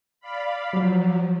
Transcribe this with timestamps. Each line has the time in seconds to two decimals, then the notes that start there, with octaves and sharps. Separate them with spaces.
0.20 D5 F5 B5
0.73 F3 F#3